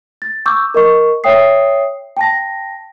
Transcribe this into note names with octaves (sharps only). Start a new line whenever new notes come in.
A6
C#6 D6 E6 G6
A#4 D#5 C#6
C#5 E5 G5 D#6 C7
G5 A5 A#6